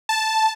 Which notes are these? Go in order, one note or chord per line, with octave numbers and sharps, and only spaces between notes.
A5